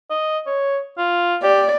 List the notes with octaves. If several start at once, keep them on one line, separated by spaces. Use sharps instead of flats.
D#5
C#5
F4
G4 D5